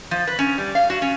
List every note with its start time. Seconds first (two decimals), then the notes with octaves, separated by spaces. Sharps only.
0.11 F3
0.27 B4
0.39 C#4
0.58 G3
0.75 F5
0.90 F#4
1.02 C#4